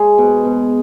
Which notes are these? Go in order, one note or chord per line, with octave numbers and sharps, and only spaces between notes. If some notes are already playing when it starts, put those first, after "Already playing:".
Already playing: G#3 G#4
B2
B2